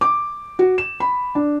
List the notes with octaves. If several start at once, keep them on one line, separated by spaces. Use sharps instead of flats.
D6
F#4
E7
B5
D4